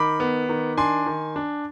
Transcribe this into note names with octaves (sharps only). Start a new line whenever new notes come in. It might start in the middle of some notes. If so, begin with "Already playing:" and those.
Already playing: D#3 B5 D6
B3
D#3
D4 G#5 C6
D#3
D4